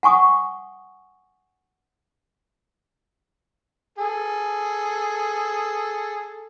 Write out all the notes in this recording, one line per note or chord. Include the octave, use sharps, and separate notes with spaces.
F#5 G#5 C#6 D#6
G#4 A4